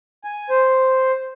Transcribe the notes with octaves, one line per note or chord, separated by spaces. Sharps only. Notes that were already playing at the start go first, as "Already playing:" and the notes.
G#5
C5